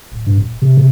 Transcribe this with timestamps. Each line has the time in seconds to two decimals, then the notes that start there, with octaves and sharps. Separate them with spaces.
0.12 D1
0.26 G2
0.38 D#1
0.62 C3
0.77 C3